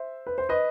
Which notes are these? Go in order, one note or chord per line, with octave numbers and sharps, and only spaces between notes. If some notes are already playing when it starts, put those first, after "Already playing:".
Already playing: C5 E5
B4
C5
B4 D#5